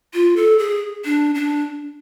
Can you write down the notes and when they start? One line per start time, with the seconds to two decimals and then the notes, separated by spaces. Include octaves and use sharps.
0.14 F4
0.36 A4
0.59 G#4
1.05 D4
1.35 D4